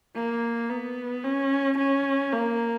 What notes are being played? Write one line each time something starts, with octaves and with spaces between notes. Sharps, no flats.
A#3
B3
C#4
C#4
A#3